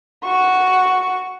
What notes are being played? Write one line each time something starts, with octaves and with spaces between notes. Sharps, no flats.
F#4 C#6